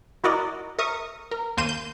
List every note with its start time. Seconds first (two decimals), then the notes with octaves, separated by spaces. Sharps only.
0.24 E4 F#4 A#4 D5 D#5
0.79 A#4 E5 C#6 D#6
1.31 A#4
1.57 D#2 A#3 C6 G6 D#7 E7
1.69 G6